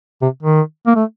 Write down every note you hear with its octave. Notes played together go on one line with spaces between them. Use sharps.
C3
D#3
A#3
A3